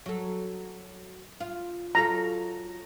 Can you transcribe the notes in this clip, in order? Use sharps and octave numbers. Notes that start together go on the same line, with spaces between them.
F#3 A4
F4
F#3 F4 A4 A#5